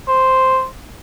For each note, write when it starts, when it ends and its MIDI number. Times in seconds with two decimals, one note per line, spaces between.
0.08 0.65 72